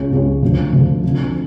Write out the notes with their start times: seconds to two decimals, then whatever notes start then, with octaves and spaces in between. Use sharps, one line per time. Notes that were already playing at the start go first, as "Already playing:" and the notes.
Already playing: C#2 C#3 G#3 C#4
0.11 C#2 C#3 G#3 C#4
0.42 D2 D3 F3
0.73 D2 D3 F3
1.04 F1 F2 D3 F3